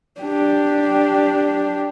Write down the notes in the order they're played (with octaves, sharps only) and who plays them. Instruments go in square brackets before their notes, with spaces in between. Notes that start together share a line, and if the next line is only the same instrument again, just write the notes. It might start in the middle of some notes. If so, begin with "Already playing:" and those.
[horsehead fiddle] D4 G4